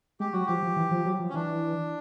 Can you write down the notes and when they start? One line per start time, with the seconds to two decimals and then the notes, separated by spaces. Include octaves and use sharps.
0.20 G#3 G4
0.33 F#3 F#4
0.46 F3 G4
0.63 F3
0.77 E3
0.91 F3
1.06 F#3
1.20 F3
1.30 C#4
1.34 E3 D4